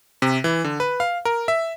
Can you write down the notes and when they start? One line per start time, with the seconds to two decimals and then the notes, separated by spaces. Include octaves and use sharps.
0.22 C3
0.44 E3
0.64 D3
0.80 B4
1.00 F5
1.25 A#4
1.48 E5